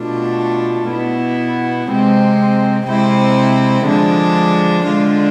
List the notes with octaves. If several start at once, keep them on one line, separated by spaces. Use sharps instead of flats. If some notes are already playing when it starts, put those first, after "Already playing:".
Already playing: B2 A3 D4 F4
B2 B3 E4
C3 G#3 C4
C3 G#3 C4 E4
D3 F3 G#3 D4
D3 G#3 D4 F4